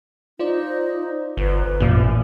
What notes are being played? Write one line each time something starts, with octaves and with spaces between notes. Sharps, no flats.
D#4 F4 C5 D5
G1 B4
A1 F#2 A#2